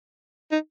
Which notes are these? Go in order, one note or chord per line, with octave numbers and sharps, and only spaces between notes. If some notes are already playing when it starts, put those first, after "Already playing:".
D#4